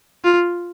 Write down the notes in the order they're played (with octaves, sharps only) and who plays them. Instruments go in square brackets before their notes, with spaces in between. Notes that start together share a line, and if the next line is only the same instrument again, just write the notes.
[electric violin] F4